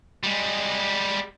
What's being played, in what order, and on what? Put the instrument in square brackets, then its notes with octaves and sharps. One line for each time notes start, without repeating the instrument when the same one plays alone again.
[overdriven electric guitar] G3 G#3